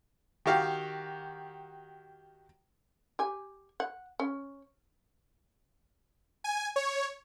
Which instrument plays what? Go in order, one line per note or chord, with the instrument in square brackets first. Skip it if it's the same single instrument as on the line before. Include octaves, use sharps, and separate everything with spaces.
[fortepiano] D#3 F#4 G4 F5
[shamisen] G4 G#5
F#5
C#4
[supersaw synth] G#5
C#5